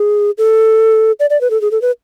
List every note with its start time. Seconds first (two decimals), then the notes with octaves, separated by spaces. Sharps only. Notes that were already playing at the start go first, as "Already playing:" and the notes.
Already playing: G#4
0.38 A4
1.20 D5
1.30 D5
1.41 B4
1.51 A4
1.61 G#4
1.71 A4
1.82 B4